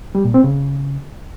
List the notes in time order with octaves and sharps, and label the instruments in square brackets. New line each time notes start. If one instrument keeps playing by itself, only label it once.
[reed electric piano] G3
A#2
C4
C#3